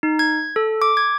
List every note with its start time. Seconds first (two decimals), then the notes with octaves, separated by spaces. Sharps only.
0.03 D#4
0.19 G#6
0.56 A4
0.82 D6
0.97 G#6